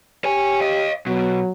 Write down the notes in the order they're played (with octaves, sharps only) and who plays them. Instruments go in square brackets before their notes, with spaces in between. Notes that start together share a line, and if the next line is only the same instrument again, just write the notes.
[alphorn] G4 [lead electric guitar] C#5 G#5
[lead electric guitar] D#5 F5
[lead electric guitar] B2 [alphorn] F#3